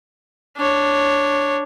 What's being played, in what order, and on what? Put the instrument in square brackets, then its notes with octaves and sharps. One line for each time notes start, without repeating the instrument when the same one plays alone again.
[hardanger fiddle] D4 C#5